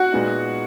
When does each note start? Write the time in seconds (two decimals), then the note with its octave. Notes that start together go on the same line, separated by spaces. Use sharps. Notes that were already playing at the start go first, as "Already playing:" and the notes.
Already playing: F#4 F#5
0.13 A#2 G#3 B3 D#4